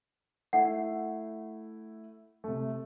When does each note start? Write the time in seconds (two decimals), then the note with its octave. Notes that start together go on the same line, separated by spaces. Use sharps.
0.53 A3 E4 F#5
2.44 C3 A3